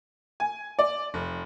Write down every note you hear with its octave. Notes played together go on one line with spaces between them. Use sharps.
G#5
D5
F1